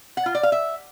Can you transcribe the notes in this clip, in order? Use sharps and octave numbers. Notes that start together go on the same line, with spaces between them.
F#5
F4
D5
F5
E5